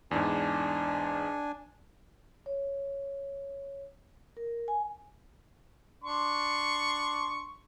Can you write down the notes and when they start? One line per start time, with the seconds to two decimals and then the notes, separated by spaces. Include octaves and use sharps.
0.11 E2 G#2 D4 G#5
2.46 C#5
4.37 A#4
4.68 G#5
6.04 D4 C6 C#6